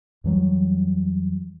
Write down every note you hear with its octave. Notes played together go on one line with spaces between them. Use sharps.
F2 E3 F#3 G3